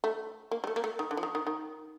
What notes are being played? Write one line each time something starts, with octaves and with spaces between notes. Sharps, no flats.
A3
A#3
G3
A3
A#3
A3
D#3
D3
F3
D#3
D#3
D#3